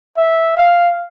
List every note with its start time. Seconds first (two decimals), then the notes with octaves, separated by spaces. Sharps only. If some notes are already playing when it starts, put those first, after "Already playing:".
0.17 E5
0.57 F5